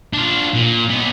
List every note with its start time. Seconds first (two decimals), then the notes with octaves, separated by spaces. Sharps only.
0.13 D4 F4
0.54 A#2
0.90 B3 D#4